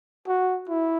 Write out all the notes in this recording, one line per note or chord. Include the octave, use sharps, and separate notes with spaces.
F#4
E4